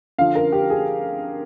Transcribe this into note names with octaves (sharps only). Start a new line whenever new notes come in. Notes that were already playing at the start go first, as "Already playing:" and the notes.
D3 F3 F5
A#4
G4
G#4